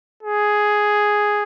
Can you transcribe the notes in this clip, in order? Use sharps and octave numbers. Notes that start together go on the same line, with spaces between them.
G#4